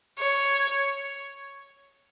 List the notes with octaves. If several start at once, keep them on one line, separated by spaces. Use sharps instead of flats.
C#5